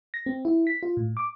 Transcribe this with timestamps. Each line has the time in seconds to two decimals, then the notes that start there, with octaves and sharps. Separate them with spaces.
0.14 A#6
0.26 C4
0.45 E4
0.67 B6
0.83 F4
0.97 A2
1.17 D6